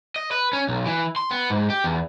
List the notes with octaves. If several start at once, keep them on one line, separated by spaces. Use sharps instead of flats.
D#5
B4
C#4
B1
E3
C6
B3
G#2
G4
E2